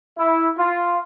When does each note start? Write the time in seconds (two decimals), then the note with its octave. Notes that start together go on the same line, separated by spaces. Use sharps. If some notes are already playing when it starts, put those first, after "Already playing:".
0.17 E4
0.57 F4